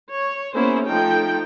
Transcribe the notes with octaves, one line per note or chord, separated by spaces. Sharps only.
C#5
A#3 B3 C#4 E4 G#4 C5
F3 A3 D#4 A4 G5